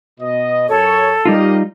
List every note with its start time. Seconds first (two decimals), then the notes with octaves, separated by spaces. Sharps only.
0.20 B2 D#5
0.69 F#2 A4 C#5
1.25 G3 D#4 F4 G4 A#4 D#5